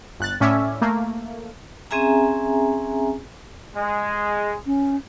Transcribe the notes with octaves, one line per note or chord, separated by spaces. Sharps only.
G1 F#6 A6
A2 C#4 D5 E5
A3 A#3
C4 C#4 G#4 E5 G#5 A#5
G#3
C#4